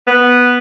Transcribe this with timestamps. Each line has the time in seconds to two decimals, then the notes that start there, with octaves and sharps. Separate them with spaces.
0.07 B3